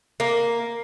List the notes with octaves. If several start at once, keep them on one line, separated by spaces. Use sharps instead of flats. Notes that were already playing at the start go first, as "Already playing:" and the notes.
A#3